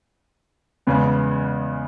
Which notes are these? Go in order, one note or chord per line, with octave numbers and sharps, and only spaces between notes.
E2 C#3 G#3 B3